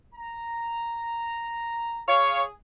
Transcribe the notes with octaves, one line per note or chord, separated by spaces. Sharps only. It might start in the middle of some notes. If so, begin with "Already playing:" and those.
A#5
G#4 C#5 F5